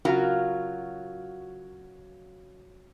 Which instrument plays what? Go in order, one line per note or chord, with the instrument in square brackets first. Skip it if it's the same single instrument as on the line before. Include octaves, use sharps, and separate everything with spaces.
[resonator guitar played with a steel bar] C#3 F#3 F4 F#4 A#4